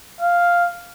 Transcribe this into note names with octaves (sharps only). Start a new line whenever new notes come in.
F5